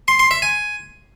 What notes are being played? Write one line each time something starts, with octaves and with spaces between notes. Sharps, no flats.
C6
C6
E5
G#5